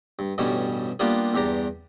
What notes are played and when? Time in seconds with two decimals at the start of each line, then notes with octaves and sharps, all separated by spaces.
0.19 G2
0.38 A1 G2 B2 G3 C#4
1.00 G3 A#3 B3 D4 F4 G4
1.34 E2 G2 D4 G4 A#5